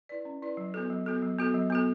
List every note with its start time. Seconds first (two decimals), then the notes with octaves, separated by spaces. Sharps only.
0.09 E4 B4 D5
0.25 C#4
0.42 E4 B4 D5
0.57 F#3
0.74 B3 F#4 A4
0.90 F#3
1.06 B3 F#4 A4
1.22 F#3
1.39 B3 F#4 A4
1.54 F#3
1.70 B3 F#4 A4